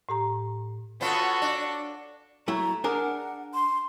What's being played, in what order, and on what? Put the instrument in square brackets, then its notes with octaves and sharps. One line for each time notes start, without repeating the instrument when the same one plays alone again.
[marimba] A2 G4 A#5
[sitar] B3 C#4 F4 [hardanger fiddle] F#4 A4
[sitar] D4
[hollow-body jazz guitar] F#3 A3 E4 [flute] A#5
[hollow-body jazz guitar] D4 G#4 A#4 [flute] F#5
[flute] C6